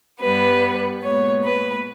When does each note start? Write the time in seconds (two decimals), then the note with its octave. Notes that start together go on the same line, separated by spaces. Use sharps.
0.19 G2 G3 B3 B4
1.02 A#2 G#3 B3 C#5
1.44 B4